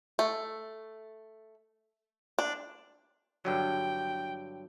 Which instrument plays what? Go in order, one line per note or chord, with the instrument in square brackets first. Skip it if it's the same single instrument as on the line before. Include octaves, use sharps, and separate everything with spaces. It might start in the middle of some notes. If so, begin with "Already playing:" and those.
[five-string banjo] A3
D4
[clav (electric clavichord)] G2 D3 F#3 [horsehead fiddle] G5